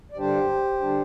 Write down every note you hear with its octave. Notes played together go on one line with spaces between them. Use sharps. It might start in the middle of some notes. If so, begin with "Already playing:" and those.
D5
G2 D3 G3 D4 G4 C5
D3 G3 D4